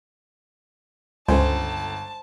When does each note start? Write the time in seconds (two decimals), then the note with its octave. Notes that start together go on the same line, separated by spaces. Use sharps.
1.28 G1 C#2 A4 C5 G#5 A5